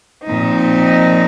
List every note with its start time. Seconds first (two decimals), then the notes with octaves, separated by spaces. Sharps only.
0.24 A#2 F3 C4 D#4